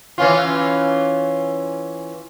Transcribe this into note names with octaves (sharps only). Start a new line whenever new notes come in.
E3 C#4 F4